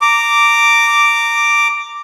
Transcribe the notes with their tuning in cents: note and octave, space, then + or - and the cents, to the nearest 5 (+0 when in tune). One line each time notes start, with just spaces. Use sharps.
A#5 -15 D6 +0